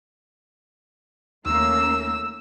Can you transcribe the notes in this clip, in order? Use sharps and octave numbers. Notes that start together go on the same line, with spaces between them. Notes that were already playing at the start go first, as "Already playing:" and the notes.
D#2 A3 A#3 C#4 E6